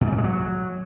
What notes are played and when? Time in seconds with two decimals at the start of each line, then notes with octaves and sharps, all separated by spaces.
0.01 B2
0.07 G#2
0.12 F#3
0.18 G#3
0.24 F#3